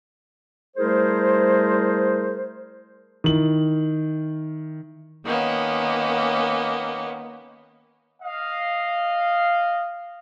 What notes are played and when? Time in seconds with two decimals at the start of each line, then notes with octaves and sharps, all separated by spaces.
0.77 G3 A3 E4 G#4 A#4 C5
3.24 D#3 E4 F#7
5.24 D#3 A#3 B3 C#4
8.23 D#5 F5